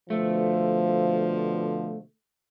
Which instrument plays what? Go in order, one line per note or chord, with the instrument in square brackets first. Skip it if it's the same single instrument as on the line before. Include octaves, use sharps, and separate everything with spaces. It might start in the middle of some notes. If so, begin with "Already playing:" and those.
[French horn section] B2 D3 F3 [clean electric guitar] A3